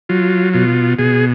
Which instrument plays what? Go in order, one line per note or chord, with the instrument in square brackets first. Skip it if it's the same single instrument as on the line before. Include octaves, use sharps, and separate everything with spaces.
[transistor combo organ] F#3 F4
B2 F4
B2 G#4